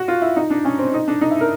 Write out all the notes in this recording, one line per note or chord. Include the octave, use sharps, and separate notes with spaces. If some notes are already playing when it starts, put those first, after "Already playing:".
Already playing: F#4
F4
E4
D#4
D4
C#4
C4
D#4
D4
D#4
E4
A#4